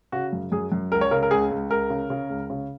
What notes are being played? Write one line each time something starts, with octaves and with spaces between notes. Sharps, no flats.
C#3 F#4
F#2
F#2 G#4
F#2
C#2 A#4
C#5
C#3 A#4
A#4
C#2 G#4
C#2
C#2 A#4
C#3
C#3
C#2
C#3